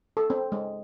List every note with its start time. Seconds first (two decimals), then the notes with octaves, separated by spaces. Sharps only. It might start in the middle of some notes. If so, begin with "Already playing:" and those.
0.17 A4
0.30 C4
0.52 G#3